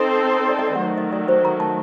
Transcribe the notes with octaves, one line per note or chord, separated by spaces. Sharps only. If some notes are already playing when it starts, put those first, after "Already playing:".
Already playing: C4 D#4 A4 C5
D5
D#5
D5
F#5
D#3 F#3 A3 D#5
D#5
D5
C5
A#5
A5